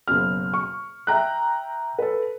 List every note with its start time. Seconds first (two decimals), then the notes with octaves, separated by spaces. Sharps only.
0.08 F#1 F#2 B2 F6
0.54 C#6
1.07 E5 G5 A#5 F#6
1.99 A4 B4